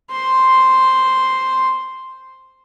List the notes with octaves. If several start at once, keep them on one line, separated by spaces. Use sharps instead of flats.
C5 C6